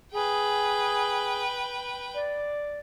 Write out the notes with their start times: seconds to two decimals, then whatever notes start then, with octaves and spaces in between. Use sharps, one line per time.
0.13 G#4 B4 G5
2.15 D5